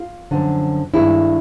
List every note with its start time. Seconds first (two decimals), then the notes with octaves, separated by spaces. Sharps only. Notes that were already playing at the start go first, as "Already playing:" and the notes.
Already playing: F4
0.31 F#2 D3 F3
0.94 G2 D#3 G#3 E4